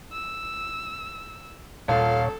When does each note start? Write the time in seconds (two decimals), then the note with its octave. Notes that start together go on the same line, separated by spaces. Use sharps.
0.12 E6
1.88 D#1 A#2 F4 A4 C#5 F5